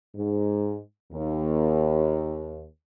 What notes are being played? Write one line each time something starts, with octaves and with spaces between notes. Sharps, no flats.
G#2
D#2